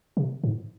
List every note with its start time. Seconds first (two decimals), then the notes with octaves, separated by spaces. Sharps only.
0.17 C3
0.44 G#2